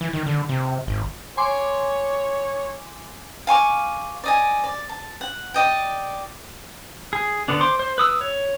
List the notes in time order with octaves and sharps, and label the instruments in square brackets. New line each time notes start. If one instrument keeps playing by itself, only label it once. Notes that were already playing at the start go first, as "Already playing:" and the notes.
[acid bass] E3
D#3
D3
C3
G#1
[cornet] C#5 [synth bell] G#5 C6 D6
[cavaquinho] F5 G#5 C#6 D6
D5 D#5 G#5
D5
A5
F#5
D5 D#5 G5
[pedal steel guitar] G#4
D3 B3 D4
C5 C6 D6
C5
B4 D#6 E6
C#5